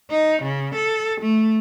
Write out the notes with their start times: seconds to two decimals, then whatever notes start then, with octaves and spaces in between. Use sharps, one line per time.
0.11 D#4
0.43 C#3
0.76 A4
1.21 A3